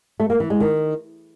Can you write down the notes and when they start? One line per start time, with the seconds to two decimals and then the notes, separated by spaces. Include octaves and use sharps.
0.20 A3
0.30 A#3
0.40 E3
0.50 G#3
0.60 D#3